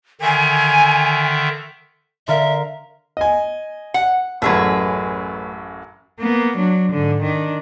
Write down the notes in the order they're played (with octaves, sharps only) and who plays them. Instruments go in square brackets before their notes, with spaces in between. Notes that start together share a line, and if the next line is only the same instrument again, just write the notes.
[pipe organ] D3 D#3 E5 [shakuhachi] G#5
[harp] D3 A#4 F5 [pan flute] E5
[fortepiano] D#5 G#5
[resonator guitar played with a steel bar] F#5
[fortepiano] A1 F#2 [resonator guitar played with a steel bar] A3 G#4 B4
[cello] A#3 B3
F#3 D4
G#2 D3
D#3 D4